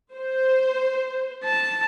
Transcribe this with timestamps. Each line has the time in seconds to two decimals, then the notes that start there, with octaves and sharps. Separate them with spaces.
0.14 C5
1.44 A5